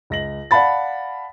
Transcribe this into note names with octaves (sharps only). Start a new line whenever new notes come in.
C#2 A#6 F#7
D5 F5 F#5 A5 B5 A6